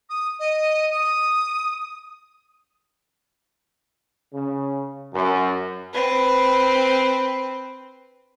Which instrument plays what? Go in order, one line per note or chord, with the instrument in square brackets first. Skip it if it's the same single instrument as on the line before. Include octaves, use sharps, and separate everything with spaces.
[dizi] D#6
D#5
D#6
[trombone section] C#3
F#2
[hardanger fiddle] C4 B4